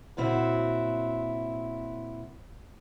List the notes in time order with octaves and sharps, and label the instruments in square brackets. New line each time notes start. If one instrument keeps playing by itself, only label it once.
[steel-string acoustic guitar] A#2 C#3 C4 E4 F#4